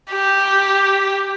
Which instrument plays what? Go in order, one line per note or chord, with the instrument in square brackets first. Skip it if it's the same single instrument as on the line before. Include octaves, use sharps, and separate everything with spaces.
[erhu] G4